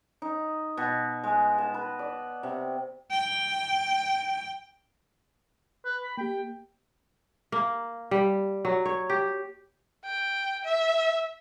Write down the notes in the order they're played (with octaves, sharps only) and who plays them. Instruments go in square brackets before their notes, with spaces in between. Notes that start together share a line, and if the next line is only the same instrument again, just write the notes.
[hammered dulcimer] D#4
B2
G#3
A5
B4
D5
C3
[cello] G5
[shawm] B4
B5
[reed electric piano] A#3 G4 [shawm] G5
[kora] A#3
G3
F#3
C#5
G4
[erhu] G5
E5